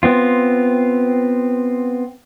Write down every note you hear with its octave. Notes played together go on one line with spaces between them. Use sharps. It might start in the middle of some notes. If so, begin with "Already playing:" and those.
B3 C4 F4